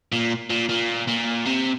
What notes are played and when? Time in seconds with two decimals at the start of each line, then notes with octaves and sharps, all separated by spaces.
0.12 A#2
0.50 A#2
0.69 A#2
1.07 A#2
1.46 C3